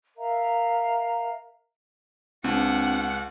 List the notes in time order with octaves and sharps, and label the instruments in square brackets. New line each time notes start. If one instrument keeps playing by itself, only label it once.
[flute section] A#4 E5 F5 A#5
[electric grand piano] C#2 [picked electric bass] C4 D4 [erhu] F#5